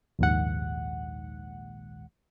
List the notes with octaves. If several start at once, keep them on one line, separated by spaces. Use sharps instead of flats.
A#1 D#2 G#2 F#5